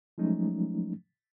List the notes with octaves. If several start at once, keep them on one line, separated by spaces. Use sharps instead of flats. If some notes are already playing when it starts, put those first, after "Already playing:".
F3 F#3 G#3 A3 C#4 D#4